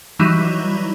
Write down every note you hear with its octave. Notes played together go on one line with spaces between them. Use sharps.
E3 F#3 G3 D#4 E4